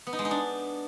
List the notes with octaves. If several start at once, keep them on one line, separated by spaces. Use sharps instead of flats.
B3
D#4
G#3
D#4
D4